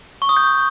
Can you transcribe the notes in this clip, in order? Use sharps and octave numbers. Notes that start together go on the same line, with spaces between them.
C#6
D#6
G6